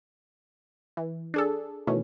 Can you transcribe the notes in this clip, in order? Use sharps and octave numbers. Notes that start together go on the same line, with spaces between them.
E3
D4 G#4 A4
B2 D#3 E3 A3 C#4